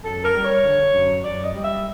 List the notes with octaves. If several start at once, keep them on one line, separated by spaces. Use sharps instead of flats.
F#2 A4
A#4
G3
C#5
D3
F#2
F#2 D5
D#5
G3
E5